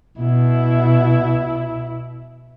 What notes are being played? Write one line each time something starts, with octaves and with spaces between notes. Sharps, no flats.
B2 E4